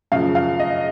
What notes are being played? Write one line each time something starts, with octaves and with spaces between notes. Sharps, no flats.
F#2 C#3 F3 F5
F5
D#5